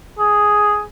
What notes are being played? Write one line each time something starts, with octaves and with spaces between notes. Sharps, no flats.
G#4